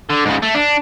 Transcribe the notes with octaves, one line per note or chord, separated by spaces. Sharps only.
D3
G#2 C#3
A3
D4